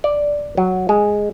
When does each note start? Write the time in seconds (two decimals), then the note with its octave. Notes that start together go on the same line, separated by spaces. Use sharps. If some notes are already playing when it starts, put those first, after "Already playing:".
0.04 D5
0.57 F#3
0.89 G#3